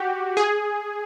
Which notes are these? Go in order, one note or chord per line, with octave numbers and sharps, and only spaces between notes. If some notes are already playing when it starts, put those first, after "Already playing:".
Already playing: F#4 G4
G#4